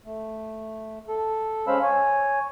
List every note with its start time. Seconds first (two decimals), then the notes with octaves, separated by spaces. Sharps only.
0.06 A3
1.08 A4
1.67 G#3 C#4 C5 F5 B5 E6
1.82 C#5 G#5